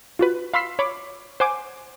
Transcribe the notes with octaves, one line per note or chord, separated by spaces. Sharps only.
F4 F#4 B4
F5 B5 C6 E6 B6 C7
C#5 B5 D6
C5 F#5 G#5 D6